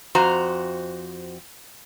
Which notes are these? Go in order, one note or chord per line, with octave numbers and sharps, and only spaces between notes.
F2 F#4 C5 A#5